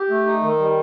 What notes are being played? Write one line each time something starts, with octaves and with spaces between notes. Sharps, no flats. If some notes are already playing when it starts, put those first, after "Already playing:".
Already playing: G4
A3
D#4
D#3
G3